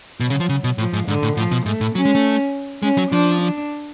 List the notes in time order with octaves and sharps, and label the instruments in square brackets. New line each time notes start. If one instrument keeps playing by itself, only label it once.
[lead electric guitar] B2 [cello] F#3
[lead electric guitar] C#3
F3
C#3
B2
[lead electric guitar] A2 [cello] F3
[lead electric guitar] G#2
[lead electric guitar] G#2 [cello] D3
[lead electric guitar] A2
[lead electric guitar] A2 [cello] F3
[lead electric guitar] B2
[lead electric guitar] G#2 [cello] A3
[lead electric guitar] A2
[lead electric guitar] F#3 [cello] C#4
[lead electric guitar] G#3
A3
[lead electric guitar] G#3 [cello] C#4
[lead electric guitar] F#3
[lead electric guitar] F3 [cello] D4
[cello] D4